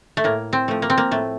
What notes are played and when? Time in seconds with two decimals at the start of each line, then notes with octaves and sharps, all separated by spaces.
0.17 A3
0.24 A2 A#3
0.53 C4
0.68 F3 A3
0.82 A#3
0.90 C4
0.98 A#3
1.11 A2 A3